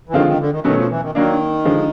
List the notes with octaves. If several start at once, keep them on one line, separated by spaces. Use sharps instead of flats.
E3
D3 D#3 F3 G#3 C4 F4
D#3
D3
D#3
B2 D#3 F#3 A3 C#4
F3
E3
D#3
D#3 F#3 A#3 D4
D3 F3 G#3